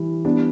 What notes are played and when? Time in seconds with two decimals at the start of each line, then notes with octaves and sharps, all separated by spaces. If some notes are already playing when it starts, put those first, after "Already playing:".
Already playing: E3 G3
0.25 G3 B3 D4